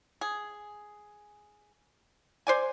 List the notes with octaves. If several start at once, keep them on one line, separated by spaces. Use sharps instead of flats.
G#4
C5 D5 G#5